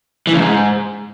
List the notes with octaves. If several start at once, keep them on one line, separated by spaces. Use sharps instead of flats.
E3
C#3
G#2